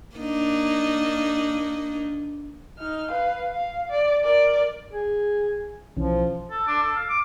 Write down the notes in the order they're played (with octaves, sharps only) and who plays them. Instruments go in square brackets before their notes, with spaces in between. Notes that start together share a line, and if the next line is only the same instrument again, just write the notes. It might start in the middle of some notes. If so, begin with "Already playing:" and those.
[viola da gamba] A#3 D4 D#4
[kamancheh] D#4 F6
B4 F5
F5
D5
A#4 D5
[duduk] G#4
[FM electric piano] B1 E3 C#4 [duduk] F3
[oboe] A4
D4
A4
F5
D6